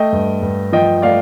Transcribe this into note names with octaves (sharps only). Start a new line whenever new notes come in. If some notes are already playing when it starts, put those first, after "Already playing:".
Already playing: A3 D#5 G5
G2
G2
F3 D#5 G5
A3 D5 F5